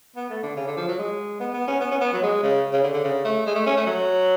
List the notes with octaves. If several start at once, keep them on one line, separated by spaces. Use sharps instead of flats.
B3
A3
D3
C#3
D3
F3
F#3
G#3
B3
B3
C#4
B3
C#4
B3
F#3
G#3
C#3
C#3
D3
D3
C#3
A3
G#3
A3
C#4
A3
F#3